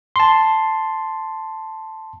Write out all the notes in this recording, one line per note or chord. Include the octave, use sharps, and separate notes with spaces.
A5 C6